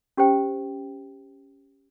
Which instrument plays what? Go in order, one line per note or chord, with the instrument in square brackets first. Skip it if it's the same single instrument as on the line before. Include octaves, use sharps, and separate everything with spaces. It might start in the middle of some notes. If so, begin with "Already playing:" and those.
[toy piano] C#4 G4 C5 G5